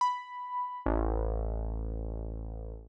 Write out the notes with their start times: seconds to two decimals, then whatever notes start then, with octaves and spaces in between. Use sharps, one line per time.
0.01 B5
0.86 A1